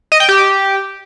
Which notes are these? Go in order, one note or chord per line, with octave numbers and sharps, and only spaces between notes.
D#5
G5
G4